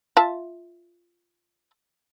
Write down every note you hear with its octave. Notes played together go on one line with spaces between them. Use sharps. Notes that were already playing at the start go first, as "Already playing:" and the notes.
F4 E5 A5